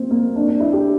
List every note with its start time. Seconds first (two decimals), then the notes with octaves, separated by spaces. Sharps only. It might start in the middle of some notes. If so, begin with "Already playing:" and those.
Already playing: A#3 C4
0.11 A#3
0.36 D4
0.48 D4
0.60 E4
0.73 G4